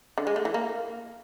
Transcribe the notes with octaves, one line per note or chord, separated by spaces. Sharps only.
D3
G#3
A3
E3
A#3